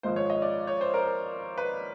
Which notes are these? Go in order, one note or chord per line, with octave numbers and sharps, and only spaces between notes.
G#1 G#2 F3 G#3 C5
C#5
D#5
D5
C#5
C5
A#4
B4